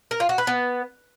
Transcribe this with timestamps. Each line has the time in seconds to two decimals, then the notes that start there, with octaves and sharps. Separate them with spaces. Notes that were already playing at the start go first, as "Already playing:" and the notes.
0.11 A#4
0.20 F4
0.29 F#4
0.38 B4
0.47 B3